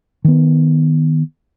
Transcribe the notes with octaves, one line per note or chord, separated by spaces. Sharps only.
D#3 B3